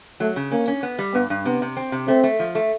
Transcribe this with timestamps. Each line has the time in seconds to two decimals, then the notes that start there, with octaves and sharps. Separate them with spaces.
0.20 F#3 A3
0.36 C#3
0.52 A#3 C#4
0.68 C#4
0.83 B3
0.99 G3
1.14 G2 B3
1.30 G2
1.45 C3 B3
1.62 C3
1.77 C4
1.92 C3
2.08 A3 C4
2.24 A3
2.39 F3
2.55 A3